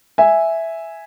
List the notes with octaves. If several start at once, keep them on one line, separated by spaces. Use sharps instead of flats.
E5 G#5